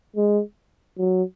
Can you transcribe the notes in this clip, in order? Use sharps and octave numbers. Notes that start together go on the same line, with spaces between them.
G#3
F#3